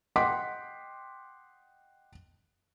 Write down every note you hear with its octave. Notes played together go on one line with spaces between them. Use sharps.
D#5 F#5 G5 C6 D6 B6